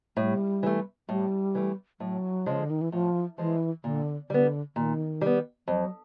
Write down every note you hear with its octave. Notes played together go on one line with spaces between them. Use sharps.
A2 G3
E3 A3
A2 G3
E3 A3
A2 F#3
C#3 F3 G#3
D3
D#3
E3
A2 F3
E3 F3 G#3
A#2 D3
D3 G3 B3
A#2 D#3
G3 B3
F2 F#3